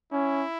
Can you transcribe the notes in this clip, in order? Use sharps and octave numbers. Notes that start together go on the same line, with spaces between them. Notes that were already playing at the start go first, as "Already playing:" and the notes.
C#4 E4